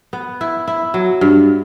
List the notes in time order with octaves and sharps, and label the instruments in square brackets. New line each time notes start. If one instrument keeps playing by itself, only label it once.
[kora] B3
E4
E4
F#3
G2